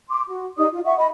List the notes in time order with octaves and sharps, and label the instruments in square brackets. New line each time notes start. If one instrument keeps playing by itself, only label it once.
[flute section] C6 D6
F#4
D#4 G4 D5 D#6
F4
E5 F#5 C#6
D#5 B5